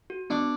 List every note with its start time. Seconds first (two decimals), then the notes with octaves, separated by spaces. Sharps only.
0.10 F#4
0.30 B3 D4